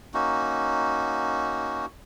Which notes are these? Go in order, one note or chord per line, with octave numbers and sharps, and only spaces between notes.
A#3 C#4 D#4 F#4